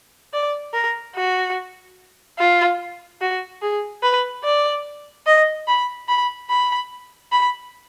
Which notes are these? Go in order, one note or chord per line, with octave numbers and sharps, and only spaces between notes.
D5
A#4
F#4
F4
F#4
G#4
B4
D5
D#5
B5
B5
B5
B5